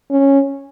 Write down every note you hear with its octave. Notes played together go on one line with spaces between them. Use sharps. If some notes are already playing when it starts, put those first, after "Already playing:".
C#4